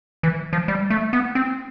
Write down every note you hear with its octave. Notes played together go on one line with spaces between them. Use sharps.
E3
F3
G3
A3
B3
C4